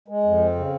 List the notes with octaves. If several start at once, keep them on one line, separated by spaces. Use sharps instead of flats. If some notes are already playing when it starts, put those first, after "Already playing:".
G#3
F2
C4
C#3